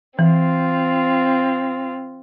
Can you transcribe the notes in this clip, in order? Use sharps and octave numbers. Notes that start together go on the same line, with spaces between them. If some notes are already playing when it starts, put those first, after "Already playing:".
E3 C4 F4